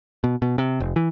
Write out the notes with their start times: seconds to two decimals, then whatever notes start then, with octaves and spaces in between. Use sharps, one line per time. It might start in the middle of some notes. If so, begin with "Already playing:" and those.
0.24 B2
0.42 B2
0.58 C3
0.80 F1
0.96 E3